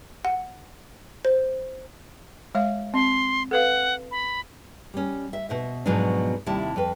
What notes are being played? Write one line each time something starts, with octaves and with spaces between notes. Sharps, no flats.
F#5
C5
G#3 C#5 F5
C4 C6
A4 B4 F5 F#5
B5
G3 C#4
E5
B2 C5 E5
G#2 B2 F3 F#3 B3 D4
D#2 C3 G3 E4 D5 A5
F2 B4